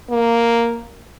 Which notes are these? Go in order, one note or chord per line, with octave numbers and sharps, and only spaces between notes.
A#3